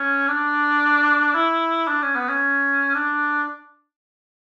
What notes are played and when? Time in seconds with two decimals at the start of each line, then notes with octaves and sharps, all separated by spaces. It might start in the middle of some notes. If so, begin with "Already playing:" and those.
Already playing: C#4
0.28 D4
1.35 E4
1.87 D4
2.02 C#4
2.15 B3
2.29 C#4
2.94 D4